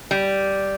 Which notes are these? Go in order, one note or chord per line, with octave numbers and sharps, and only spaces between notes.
G3